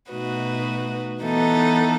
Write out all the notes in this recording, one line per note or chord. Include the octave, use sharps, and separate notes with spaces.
B2 A3 D#4 F#4 B4
E3 B3 D#4 A4